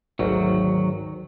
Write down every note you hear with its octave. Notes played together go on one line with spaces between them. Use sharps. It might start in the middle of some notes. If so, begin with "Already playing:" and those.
G#1 D2 D#3 F#3